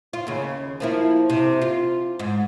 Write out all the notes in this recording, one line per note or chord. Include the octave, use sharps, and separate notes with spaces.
F4
D#2 C#3
F3 A#3 E4
C3
F4
G#2